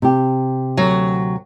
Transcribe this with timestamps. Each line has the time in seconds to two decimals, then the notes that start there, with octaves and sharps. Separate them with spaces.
0.02 C3 G4
0.77 D2 F#3